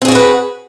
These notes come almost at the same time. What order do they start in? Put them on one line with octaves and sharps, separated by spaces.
C4 G#4 F#4 E4 B4